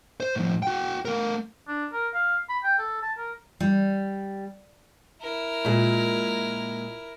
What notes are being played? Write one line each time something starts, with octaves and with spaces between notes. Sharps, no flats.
C5
A2 F3
F#4 G5
A3 A#4
D4
A#4
F5
B5
G5
A4
A5
A#4
G3
E4 A#4
A#2 G#3